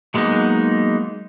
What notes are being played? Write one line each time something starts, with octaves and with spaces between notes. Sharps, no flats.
F#3 G#3 A#3 B3 D#4